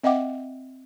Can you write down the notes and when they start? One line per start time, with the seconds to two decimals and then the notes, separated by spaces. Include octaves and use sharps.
0.04 C4 D#5 E5 F#5 G5 D6